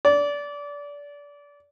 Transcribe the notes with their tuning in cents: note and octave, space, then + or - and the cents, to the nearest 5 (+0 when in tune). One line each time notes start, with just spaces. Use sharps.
D5 -25